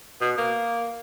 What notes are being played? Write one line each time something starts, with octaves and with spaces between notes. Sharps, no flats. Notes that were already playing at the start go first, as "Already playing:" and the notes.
B2
A#3